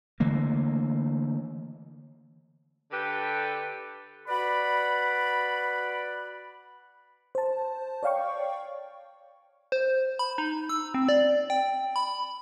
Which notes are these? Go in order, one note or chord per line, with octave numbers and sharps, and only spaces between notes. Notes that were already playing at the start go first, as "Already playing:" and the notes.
D3 E3 A3 A#3
D3 G4 A4 B4
F#4 B4 D5 F#5 B5
C5 A5
C#5 D5 F5 G5 C#6
C5
B5
D#4
E6
C4
D5
G5
B5